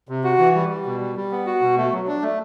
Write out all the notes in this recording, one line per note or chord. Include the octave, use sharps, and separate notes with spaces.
C3
F#4
E3
G3
G3
B2
G3
G3
B3
F#4
B2
A3
F#3
D4
A3